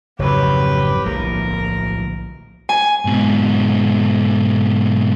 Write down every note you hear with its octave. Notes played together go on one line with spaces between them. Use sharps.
G#1 F2 C#3 F#3 G4 B4 C#5
D1 B1 F3 A#3 A#4
G#5
G#2 B2